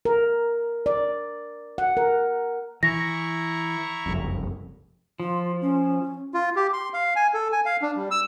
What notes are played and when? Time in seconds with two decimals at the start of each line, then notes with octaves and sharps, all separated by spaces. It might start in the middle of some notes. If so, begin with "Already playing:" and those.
0.05 A#4
0.86 D5
1.78 F#5
1.97 A#4
2.83 E3 E4 A#5 C#6 A#6
4.06 F#1 C2 F2
5.20 F3 F4
5.61 C#4
6.34 F4
6.56 G4
6.73 C6
6.94 F5
7.16 G#5
7.34 A4
7.52 G#5
7.66 F5
7.82 D4
7.96 G3
8.11 E6